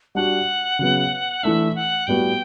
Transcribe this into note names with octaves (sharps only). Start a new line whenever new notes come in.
G3 D4 F#4 F#5
C#3 F#3 B3
E3 A3 D4 E5
F#5
A2 G3 B3 F#4 G5